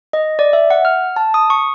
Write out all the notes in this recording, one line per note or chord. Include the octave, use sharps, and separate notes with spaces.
D#5
D5
E5
F#5
F6
A5
D#6
C#6